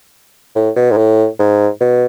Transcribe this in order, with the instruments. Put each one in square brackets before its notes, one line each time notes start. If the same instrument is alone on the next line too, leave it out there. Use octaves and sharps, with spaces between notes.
[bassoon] A2
B2
G#2
A2
G#2
B2